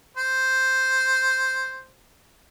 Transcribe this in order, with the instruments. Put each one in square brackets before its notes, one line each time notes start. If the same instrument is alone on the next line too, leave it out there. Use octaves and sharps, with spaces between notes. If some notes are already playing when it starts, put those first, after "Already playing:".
[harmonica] C5